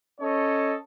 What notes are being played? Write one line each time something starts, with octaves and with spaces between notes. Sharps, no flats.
C#4 A4 C#5 D#5